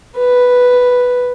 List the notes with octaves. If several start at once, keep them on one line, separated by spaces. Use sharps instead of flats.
B4